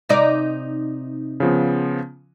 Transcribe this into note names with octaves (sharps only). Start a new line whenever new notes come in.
C3 D#4 D5
C#3 F3 B3